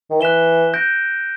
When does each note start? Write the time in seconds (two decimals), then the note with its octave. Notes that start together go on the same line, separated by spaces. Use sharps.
0.10 D#3
0.20 E3 F#6 B6 E7 G7
0.74 G6 A#6 D7